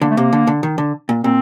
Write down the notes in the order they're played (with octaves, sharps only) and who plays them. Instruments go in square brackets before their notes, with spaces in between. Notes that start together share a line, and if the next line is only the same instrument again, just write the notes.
[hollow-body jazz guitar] D3 [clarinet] A#3
[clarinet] A3
[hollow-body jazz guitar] C3 [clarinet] A#3
[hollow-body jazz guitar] D3
D3
D#3
D3
A#2
[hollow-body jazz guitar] A#2 [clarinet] C4